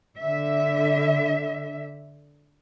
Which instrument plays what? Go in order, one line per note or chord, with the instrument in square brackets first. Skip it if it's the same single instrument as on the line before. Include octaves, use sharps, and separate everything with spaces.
[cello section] D3 E5